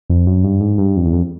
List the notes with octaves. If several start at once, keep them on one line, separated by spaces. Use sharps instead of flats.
F2
F#2
G2
G#2
G2
F2
E2
F2